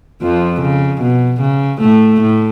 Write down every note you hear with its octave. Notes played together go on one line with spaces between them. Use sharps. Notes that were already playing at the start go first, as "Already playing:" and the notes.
F2 F3
C#3
B2
C#3
A2 A3
A2